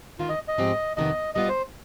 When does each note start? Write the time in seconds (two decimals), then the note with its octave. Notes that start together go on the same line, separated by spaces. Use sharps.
0.19 D2 C3 D#3 F4
0.29 D#5
0.48 D#5
0.58 G#2 F3 C4 G4
0.97 F2 C3 D#3 B3 D#5
1.35 B2 G3 B3 F4 D#5
1.49 C5